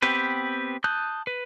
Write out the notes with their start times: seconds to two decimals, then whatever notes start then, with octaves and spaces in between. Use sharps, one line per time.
0.02 B3 C4 G4 B4
0.84 A5 D#6 F#6 G6
1.27 B4